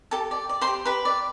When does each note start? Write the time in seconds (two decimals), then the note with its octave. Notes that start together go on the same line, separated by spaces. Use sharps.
0.11 G4 A4 A5
0.31 D5
0.49 D5
0.61 C5 C6
0.67 G4
0.85 G4 B4 B5
1.05 D5